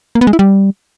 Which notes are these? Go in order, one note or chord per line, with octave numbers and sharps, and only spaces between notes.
A#3
B3
G#3
E4
G3